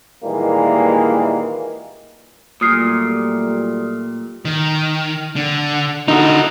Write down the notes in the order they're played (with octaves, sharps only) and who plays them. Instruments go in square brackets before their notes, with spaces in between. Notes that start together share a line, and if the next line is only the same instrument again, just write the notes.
[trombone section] A#2 D#3 E3 G3 G#3 A#3
[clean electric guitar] A#2 [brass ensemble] F#3 G3 A3 [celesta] D#6 F6 C7
[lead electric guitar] D#3
D3
[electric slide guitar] D3 D#4 [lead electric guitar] E4 F#4